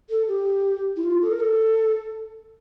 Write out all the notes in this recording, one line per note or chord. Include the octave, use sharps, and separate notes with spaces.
A4
G4
E4
F4
A4
A#4
A4